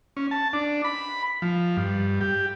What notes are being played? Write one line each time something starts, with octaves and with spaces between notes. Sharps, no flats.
C#4
A5
D4
B5
F3
G2
G4